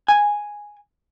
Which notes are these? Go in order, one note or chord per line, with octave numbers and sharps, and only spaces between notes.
G#5